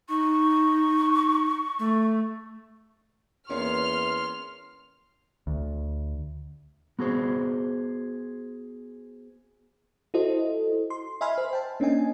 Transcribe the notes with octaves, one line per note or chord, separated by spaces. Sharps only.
D#4 C#6
A3
E2 A#3 B3 C#4 C6 F6
D2
B3 F#4 G#4 C5
E4 F#4 A4 C5 D#5
C6
D#5 E5 G#5 B5 C6 F6
C5
G5 A5
A#3 C#4 D4 D#5 G#5